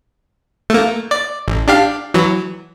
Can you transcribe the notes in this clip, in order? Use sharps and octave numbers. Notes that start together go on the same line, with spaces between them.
A3 A#3
D5
A1
D4 G4 F5
E3 F#3